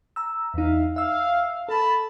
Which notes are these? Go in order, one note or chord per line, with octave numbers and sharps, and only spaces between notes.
A#5 E6
E2 D#4 E5 F5
E5 F5 E6
A4 A5 B5